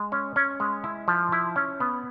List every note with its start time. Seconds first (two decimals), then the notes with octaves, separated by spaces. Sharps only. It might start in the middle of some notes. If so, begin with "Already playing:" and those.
Already playing: G#3
0.12 C#4
0.36 C#4
0.60 G#3
0.84 E4
1.08 F3
1.32 E4
1.56 C#4
1.80 B3